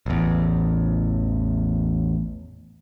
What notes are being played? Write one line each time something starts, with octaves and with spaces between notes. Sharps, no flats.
A1 E2